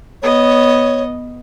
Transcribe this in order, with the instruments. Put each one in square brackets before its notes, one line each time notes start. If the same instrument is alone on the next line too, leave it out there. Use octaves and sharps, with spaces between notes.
[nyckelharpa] B3 D#5 [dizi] C#5